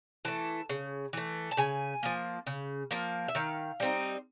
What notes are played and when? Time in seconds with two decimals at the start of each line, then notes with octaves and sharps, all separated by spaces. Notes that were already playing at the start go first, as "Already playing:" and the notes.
0.25 E3 A3 A5
0.69 C#3
1.13 E3 A3
1.51 A5
1.57 C#3 G#5
2.03 F3 A#3
2.47 C#3
2.91 F3 A#3
3.28 E5
3.35 D#3 F5
3.80 G3 C4 D#4